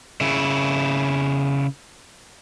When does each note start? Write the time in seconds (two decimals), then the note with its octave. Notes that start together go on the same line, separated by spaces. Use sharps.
0.21 C#3 E4